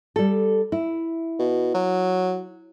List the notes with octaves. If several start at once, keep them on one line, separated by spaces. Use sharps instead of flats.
G3 A4
E4
B2
F#3